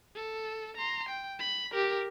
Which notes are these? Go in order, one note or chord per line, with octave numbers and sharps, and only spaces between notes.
A4
A#5 C6
G5
B5
G4 A#4